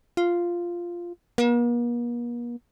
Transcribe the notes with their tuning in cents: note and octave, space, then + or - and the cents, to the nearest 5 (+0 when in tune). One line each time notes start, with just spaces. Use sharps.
F4 -5
A#3 +45